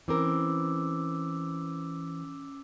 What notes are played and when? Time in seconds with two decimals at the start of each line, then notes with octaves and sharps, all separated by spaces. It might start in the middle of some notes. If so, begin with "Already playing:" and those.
0.08 E3 C4 C#4 A#4 D6 E6